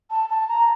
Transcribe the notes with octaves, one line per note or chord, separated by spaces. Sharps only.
A5
A5
A#5